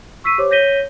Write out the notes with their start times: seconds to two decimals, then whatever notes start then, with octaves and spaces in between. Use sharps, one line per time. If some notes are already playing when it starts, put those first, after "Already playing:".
0.24 C#6 E6 B6 C7 D#7
0.38 G4 C5 C#5 D6
0.51 C#5 G6 A#6 B6 D#7 G7